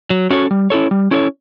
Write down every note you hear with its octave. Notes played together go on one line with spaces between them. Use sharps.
F#3
C#4 F#4 A4 C#5
G3
C#4 E4 A4 C#5
G3
C#4 E4 A4 C#5